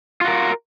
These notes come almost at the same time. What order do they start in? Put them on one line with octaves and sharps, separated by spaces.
F4 F#4 A#4